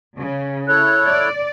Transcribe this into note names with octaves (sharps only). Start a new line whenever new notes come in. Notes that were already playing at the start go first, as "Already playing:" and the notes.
C#3
E4 A4 C#5 F#6
D5